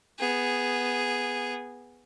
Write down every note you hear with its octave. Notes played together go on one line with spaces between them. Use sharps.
B3 G#4